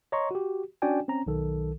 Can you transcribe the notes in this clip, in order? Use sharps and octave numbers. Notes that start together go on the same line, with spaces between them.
C#5 D#5 A#5 C6 C#6
F#4 G4
C#4 D4 F#4 D5 G5 G#5
C4 C#4 A#5
B1 D#3 A4